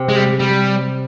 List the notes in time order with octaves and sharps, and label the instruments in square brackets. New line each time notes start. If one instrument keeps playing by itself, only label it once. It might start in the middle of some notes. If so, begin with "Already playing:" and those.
Already playing: [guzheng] C3
[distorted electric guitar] G#3
G3
G3